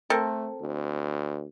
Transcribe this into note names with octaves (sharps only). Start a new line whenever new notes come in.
A3 C4 A4 A#4
D2